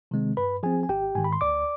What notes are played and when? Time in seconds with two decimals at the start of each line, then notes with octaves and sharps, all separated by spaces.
0.11 C3 D#3 G#3 C4
0.37 G2 B4 B5
0.63 F3 C4 G#4 G#5
0.83 G#5
0.89 G#1 G4 G5
1.15 G#2 D#3 G#5
1.24 B5
1.33 C6
1.41 D2 D5 D6